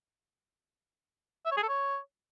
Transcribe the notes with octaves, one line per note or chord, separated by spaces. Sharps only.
E5
C#5
G#4
A4
C#5